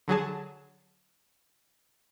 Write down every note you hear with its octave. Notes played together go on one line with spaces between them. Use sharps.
D3 F#3 G#4 A5